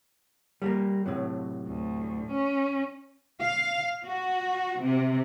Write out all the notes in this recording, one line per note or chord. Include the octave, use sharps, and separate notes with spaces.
G3 A3 A#3
A2 C3 F#3
D2
C#4
F5
F#4
C3